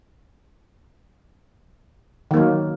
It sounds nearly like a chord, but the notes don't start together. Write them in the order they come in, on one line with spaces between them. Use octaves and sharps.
D#3 A#3 F#3